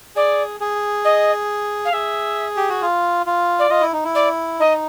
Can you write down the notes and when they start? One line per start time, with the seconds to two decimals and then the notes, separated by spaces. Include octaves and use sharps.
0.16 G#4 D5
0.60 G#4
1.05 D#5
1.85 F5
1.93 G#4 E5
2.57 G4
2.70 F#4
2.82 F4
3.26 F4
3.59 D5
3.70 F4 D#5
3.81 E4
3.93 D#4
4.04 E4
4.15 D5
4.59 D#4 D#5